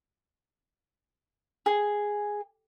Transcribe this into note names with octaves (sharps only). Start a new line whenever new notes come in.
G#4